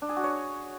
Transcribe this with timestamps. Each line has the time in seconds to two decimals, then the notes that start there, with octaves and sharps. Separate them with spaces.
0.02 D4
0.09 G#4
0.16 F#4
0.24 C#5